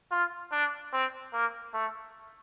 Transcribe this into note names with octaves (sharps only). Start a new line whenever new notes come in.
F4
D4
C4
A#3
A3